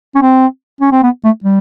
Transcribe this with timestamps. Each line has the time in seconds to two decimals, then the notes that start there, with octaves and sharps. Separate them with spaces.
0.15 C#4
0.22 C4
0.81 C#4
0.92 C4
1.03 B3
1.24 A3
1.44 G3